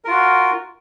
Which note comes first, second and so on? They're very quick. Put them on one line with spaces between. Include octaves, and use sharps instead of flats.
A#4 F4 F#4